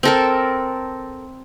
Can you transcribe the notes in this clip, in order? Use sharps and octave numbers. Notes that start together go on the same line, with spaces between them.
C4 A4 A#4